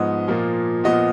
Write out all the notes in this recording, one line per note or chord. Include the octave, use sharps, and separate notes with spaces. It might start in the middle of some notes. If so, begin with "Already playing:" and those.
Already playing: G#2 F3 B3 D#5
A#2 F3 A#3
A#2 F3 B3 D#5